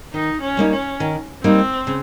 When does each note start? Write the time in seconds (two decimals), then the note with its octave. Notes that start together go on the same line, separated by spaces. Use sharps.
0.13 D#3 D#4
0.42 C#4
0.57 G3 A#3 D#4
0.72 C#4
1.00 D#3
1.43 G3 A#3 C4 D#4
1.87 C#3